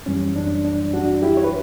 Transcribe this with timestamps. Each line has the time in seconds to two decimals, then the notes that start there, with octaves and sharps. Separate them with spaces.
0.06 F#2 E3 G3 C#4
0.36 D4
0.64 D4
0.93 D4 F#4
1.22 E4 G4
1.37 C#5
1.44 B4